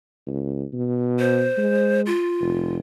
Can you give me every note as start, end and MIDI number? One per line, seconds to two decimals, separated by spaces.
0.27 0.65 37
0.73 1.49 47
1.19 2.01 72
1.58 2.11 56
2.06 2.76 65
2.41 2.80 29